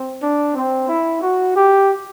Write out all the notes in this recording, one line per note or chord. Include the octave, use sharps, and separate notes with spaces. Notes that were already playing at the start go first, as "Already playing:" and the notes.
Already playing: C4
D4
C4
E4
F#4
G4